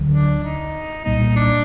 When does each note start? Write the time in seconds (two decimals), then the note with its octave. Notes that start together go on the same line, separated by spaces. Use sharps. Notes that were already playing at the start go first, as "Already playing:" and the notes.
Already playing: D2 D3 F#3
0.13 D4
0.43 D#4
1.04 C2 A#2 G3 A#3 D#4
1.36 D4